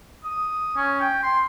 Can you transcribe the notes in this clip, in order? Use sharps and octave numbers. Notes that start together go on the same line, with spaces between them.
D#6
C#4
G5
C6